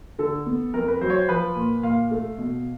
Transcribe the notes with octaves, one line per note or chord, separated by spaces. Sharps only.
D3 A4
B3
F2 A#4
B4
F#3 C5
C#5
C5
F3 B4
A#2
A#2 F5
A3
B2